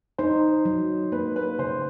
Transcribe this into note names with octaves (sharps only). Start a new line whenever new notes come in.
D#4 C5
F#3
A#3 B4
B4
C#3 C5